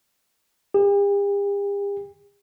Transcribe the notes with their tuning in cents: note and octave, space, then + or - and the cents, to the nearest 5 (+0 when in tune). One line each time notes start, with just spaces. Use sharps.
G4 +45